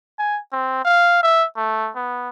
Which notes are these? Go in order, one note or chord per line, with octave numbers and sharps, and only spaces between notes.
G#5
C4
F5
E5
A3
B3